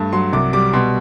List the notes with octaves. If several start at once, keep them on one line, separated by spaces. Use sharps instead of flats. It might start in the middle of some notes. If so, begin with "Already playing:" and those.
Already playing: G2 A3 A5
F#3 C6
C2 D6
G3 D6
B2 C6